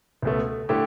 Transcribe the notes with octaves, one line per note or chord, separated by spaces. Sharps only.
C#2 B2 A3
D3 A3 E4 G4